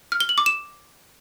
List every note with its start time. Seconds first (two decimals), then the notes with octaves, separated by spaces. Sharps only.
0.12 F6
0.20 G7
0.29 F#7
0.38 D6
0.46 E7